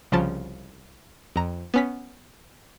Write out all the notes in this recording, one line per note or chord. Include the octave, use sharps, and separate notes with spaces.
C2 C#3 F3 A5
F2 A#5
B3 C#4 B6